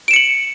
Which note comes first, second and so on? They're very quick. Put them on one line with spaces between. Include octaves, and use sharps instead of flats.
D7 E7 C#7 F#7